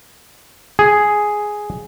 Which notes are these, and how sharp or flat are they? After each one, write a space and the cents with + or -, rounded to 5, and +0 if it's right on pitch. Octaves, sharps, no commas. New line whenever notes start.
G#4 +5